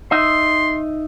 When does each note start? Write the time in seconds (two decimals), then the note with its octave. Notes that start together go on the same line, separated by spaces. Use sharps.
0.11 D#4 D#5 E5 C6